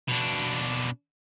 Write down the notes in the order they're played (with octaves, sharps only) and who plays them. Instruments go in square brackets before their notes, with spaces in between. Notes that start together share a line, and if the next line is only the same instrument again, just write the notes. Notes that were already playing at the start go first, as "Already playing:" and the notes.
[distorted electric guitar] B2 D4